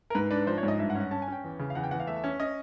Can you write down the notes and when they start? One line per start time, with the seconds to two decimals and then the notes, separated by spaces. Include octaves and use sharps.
0.10 A#4
0.15 G#2 B4
0.31 D4 B4
0.47 F3 C5
0.58 C#5
0.63 G#2
0.68 D#5
0.79 G2 E5
0.90 F#5
0.95 C#4
1.00 F#5
1.11 C#4 A5
1.22 G#5
1.28 C#4 G5
1.44 E2
1.59 C#3
1.70 F5
1.75 E2 F#5
1.84 G5
1.91 E2 F#5
2.00 F5
2.07 A3 E5
2.24 C#4
2.40 C#4 D#5